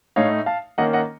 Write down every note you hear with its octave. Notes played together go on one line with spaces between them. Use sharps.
A2 A3 D#4 C#5 F5
F5 A5
D#3 A#3 C#4 D#5 F#5
D#5 F#5